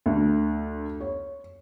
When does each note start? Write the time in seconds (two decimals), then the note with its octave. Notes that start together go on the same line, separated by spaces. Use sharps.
0.06 D2
1.01 C#5